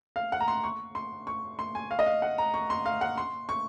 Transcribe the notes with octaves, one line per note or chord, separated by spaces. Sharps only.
F5
F#5
A#5
C6
C#6
C6
C#6
C6
G#5
F5
D#5
F5
F#5
A#5
C#6
C6
F5
F#5
C6
C#6